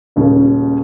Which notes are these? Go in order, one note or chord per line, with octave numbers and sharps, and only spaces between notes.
D#1 D#2 C#3 G#3